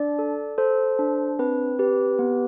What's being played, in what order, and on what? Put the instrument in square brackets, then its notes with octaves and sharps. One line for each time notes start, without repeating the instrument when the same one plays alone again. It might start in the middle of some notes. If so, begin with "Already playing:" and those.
Already playing: [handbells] D4 D5
A4
A4 C5
D4
C4 B4
G4 B4
B3